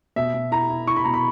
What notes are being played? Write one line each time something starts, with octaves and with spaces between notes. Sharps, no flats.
B2 E5
B2
E4 A#5
E4
E4 C#6
B5
B2 A#5
B5